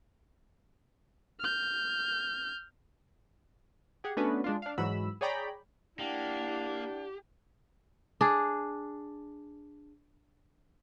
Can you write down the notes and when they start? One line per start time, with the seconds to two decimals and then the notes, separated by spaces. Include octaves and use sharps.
1.40 F6 G6
4.04 G4 G#4 F#5
4.17 A3 B3 C#4 D4 F#4 B4
4.44 G#3 D4 F4
4.62 D4 F5
4.78 G#2 E3 F#3 F#4 B5 E6
5.21 G#4 C#5 D5 G5 A#5 B5
5.99 A#3 D4 E4 G4 F#5
8.21 D4 G#4